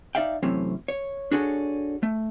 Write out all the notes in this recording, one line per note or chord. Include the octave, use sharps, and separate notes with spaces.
D#4 D5 E5 F5 G5
C3 E3 F#3 A3 C4 C#4
C#5
D4 F#4 G#4 A4 C5 C#5
A3